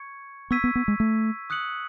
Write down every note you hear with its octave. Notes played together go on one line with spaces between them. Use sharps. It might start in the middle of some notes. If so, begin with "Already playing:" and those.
Already playing: C#6 G#6 C#7
B3 C#6 E6 G#6 B6 D#7
B3
B3
G#3
A3
D#6 F#6 C#7 F#7